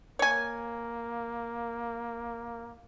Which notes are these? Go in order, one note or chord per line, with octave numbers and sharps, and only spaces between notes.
A#3 C#5 G#5